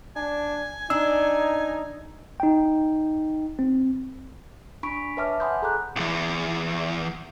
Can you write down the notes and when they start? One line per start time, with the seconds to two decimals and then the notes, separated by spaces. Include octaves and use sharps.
0.16 D4 G#5
0.90 D4 D#4 E6
2.40 D#4 G5
3.59 C4
4.83 D4 B5 C#6 B6 D7
4.96 D4
5.17 B4 C#5 E5 A5 D6 F6
5.40 F#5 G#5 B5 C6 D#6 G6
5.62 G#4 A4 A#5 C6 D6 F#6
5.96 B1 E2